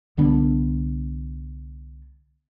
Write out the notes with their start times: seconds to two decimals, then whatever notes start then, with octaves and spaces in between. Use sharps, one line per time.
0.17 C2 D3 B3 D4